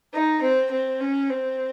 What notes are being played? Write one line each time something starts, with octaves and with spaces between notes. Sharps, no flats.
D#4
C4
C4
C#4
C4